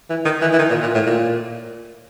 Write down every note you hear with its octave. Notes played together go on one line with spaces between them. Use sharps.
E3
D#3
E3
E3
D#3
A#2
A#2
A2
A#2